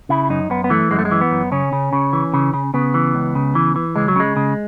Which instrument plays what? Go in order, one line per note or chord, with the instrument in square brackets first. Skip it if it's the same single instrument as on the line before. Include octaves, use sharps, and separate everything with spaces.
[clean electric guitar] C#3 E4
F#2 D#4
F#2 B3
B3
E3 A3
F#2 G#3
A3
G#3
E3
B3
F#2
C#3 C#4
C#3
C#3
E3
C#3
C#3
C#3 B3
E3
C#2
C#3
E3
E3
C#2 G#3
F#3
C#3 G#3
C#3